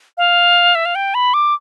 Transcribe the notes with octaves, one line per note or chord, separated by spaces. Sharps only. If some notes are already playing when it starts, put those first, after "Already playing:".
F5
E5
F5
G5
B5
D6